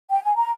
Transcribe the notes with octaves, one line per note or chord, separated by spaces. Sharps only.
G5
G#5
A#5